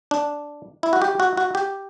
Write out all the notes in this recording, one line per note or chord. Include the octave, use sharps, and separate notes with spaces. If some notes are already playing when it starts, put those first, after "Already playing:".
D4
E4
F#4
G4
F#4
F#4
G4